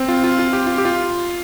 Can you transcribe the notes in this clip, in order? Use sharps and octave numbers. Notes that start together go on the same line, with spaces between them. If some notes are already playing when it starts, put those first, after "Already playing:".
Already playing: C4
F4
F4
F4
G4
F4
G4
F4